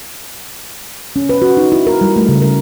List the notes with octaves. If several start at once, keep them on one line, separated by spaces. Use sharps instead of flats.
C#4
B4
F#4
D#4
E4
A#4
G3
A3
C#3
A#4